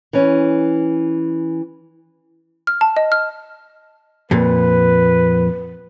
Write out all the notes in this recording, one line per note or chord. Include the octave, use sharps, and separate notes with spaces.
E3 C#4
F6
A5
D#5
F6
F2 A#2 B4